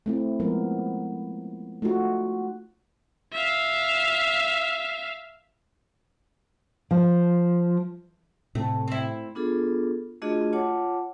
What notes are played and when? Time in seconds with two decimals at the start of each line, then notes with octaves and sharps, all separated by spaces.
0.06 A3 C4 E4
0.40 F3 G#3 A#3 B3 A#4
1.82 A3 D#4 F4 F#4
3.33 E5 F5
6.91 F3
8.55 A2 C3 A3
8.88 C4 E4
9.35 B3 D4 F4 G#4 A4
10.22 A3 D4 F4 F#4 G#4 D#5
10.53 F4 C#5 F#5 A5 D6